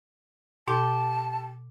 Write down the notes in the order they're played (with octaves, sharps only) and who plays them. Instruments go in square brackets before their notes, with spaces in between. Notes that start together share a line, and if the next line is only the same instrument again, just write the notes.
[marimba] B2 [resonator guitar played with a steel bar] G4 [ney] A5